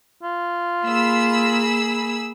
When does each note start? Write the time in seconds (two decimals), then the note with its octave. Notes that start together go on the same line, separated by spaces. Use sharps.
0.23 F4
0.85 A#3 G#4 B5 E6